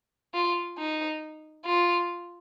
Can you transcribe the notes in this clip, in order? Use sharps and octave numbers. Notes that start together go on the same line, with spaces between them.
F4
D#4
F4